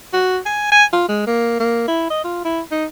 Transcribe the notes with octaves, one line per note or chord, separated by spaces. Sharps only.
F#4
G#5
G#5
F4
G#3
A#3
A#3
E4
D#5
F4
E4
D#4